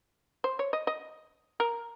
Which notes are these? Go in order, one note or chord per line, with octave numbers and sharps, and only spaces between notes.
C5
C#5
D#5
D#5
A#4